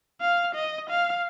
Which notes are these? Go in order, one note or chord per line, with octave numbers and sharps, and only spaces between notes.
F5
D#5
F5